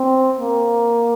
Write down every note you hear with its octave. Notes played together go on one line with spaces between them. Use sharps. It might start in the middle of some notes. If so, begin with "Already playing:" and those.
Already playing: C4
A#3